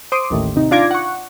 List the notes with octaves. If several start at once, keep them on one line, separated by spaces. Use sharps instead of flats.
C5 C6 D6 D#6
A1 D#2 A2
C3 D#4
D4 F4 D6 G#6 A#6
F#5 C#6